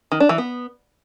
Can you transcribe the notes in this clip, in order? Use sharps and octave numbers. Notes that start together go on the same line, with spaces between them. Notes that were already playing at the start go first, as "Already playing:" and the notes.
D#3
D4
E3
B3